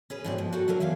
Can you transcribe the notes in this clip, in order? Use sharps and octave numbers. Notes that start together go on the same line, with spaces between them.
C#4 G#4 B4
G#2 B2 C4 D4 G4 D5
F3
F#4 G4 A4 A#4
D3 F#3 D4 A#4
E2 E3 D5 F5